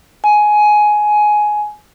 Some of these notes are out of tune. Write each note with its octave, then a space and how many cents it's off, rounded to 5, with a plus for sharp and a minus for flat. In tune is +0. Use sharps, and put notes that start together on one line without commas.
G#5 +15